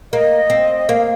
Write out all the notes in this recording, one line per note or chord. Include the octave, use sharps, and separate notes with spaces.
A#3 D#5
C4
A#3 F5